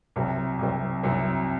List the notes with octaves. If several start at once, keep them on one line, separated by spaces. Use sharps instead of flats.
C2 C3 F#3 C4
C2 C3 F#3 C4
C2 C3 F#3 C4